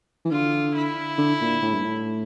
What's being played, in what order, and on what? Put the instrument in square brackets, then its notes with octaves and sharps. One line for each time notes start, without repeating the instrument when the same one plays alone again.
[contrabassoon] E3
[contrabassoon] D3 [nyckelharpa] F4
[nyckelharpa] E4
[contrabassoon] D3
A#2
A2
G2
A2